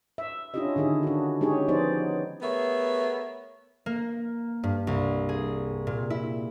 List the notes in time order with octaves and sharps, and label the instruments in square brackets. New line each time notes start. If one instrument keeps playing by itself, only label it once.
[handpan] E5
C#4 D4 E4 F4 G4 D#5
D3 D#3 D#4 G#4
D4 F#4
G#3 C#4 D#4 G4 G#4 C#5
F3 B3 D#4 C5 D5
[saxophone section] A3 B3 G#4 A#4 C#5 E5
[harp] A#3
G2
C2
G#4
A#2
E4